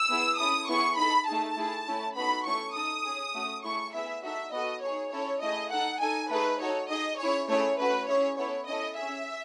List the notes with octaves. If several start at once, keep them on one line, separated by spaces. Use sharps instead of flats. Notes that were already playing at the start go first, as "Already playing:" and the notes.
Already playing: E6
B3 E4 G#4
C#4 E4 A4 D#6
B3 E4 G#4 C#6
D#4 A4 B5
A3 D#4 G#4 A5
A3 E4 G#4
A3 C#4 E4
B3 D#4 F#4 A4 B5
A3 C#4 E4 A4 C#6
D#4 A4 D#6
C#4 G#4
A3 C#4 F#4
A3 E4 G#4 C#6
B3 E4 G#4 E5
D#4 F#4 A4 E5
B3 F#4 A4 D#5
D#4 G#4 C#5
C#4 E4 A4 C#5
A3 E4 G#4 D#5
D#4 A4 F#5
D#4 A4 G#5
A3 D#4 G#4 B4
D#4 F#4 A4 C#5
D#4 G#4 D#5
C#4 E4 G#4 C#5
A3 C#4 E4 G#4 C#5
A3 C#4 F#4 B4
C#4 E4 G#4 C#5
B3 E4 A4 C#5
C#4 E4 A4 D#5
C#4 G#4 E5